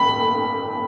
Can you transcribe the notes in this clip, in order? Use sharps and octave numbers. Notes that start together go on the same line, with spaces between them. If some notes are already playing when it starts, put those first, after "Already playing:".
Already playing: B5